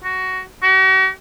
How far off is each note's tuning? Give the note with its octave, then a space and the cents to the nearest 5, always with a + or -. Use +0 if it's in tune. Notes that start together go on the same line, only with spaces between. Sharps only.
F#4 +15
F#4 +45